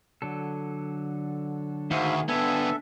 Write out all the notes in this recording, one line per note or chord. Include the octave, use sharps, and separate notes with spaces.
D3 F#3 A4
D2 G#2 D#3 G#4 E5 F5
D3 B3 D4 A4 E5 G#5